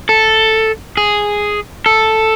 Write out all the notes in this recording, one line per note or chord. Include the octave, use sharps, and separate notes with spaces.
A4
G#4
A4